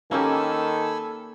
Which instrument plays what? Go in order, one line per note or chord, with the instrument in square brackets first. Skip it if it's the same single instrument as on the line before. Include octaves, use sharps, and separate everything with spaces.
[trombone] D#3 [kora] A#3 C#4 G4 [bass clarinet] A4 [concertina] G#5 B5 E6